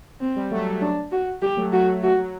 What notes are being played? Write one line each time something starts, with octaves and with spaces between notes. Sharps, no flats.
C4
G3
F#3 A3
F#3
D4
F#4
G3 G4
F#3 A3
F#3 A3 F#4
F#3 A3 F#4
F#3